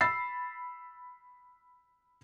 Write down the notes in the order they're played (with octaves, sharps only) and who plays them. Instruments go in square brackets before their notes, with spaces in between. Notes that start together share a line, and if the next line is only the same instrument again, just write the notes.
[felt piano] B5 E6 A6 C7